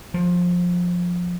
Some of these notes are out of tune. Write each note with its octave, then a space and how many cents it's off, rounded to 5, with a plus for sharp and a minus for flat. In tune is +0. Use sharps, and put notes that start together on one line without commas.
F3 +20